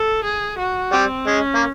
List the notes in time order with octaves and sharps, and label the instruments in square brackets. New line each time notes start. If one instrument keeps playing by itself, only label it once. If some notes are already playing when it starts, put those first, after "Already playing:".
Already playing: [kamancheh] A4
G#4
F#4
[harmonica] G3 [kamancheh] C4
[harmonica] G#3 [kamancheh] C#4
[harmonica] A#3